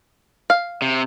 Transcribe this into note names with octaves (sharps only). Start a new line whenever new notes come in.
F5
C3